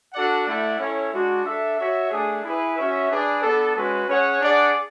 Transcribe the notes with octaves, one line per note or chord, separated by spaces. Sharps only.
D4 F#4 A4 D5 F#5
A3 E4 A4 D5 F#5
C#4 E4 A4 C#5
G#3 D4 F#4
D4 A4 E5
F#4 C#5 E5
A3 D4 G#4
E4 G#4 B4
C#4 F#4 C#5 E5
D4 G#4 B4 D5
B3 D4 A4
G#3 C#4 F#4 B4
C#4 G#4 C#5 F#5
D4 G#4 D5 F#5